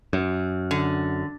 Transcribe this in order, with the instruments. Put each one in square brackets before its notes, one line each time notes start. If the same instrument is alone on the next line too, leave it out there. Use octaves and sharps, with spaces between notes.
[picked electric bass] F#2
[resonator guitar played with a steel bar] D3